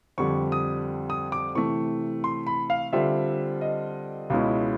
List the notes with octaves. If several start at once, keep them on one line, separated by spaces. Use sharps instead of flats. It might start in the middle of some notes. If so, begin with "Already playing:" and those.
F2 D3 G3 C#6
D#6
D#6
D6
C3 E3 A3 C#6
C6
B5
F5
D3 G3 C4 F4 E5
D#5
C#2 B2 G#3 C#4 E4